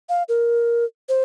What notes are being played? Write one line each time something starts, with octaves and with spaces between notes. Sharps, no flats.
F5
A#4
C5